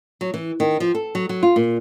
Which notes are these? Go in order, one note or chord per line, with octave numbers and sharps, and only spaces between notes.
F#3
E3
D#3
F3
A4
F#3
F#3
F4
A#2